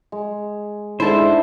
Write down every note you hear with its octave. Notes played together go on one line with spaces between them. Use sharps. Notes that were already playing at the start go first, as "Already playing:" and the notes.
G#3
G#2 A3 D4 E4 C5 A5